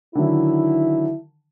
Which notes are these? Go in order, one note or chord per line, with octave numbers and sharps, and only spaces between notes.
D3 D#3 F#3 E4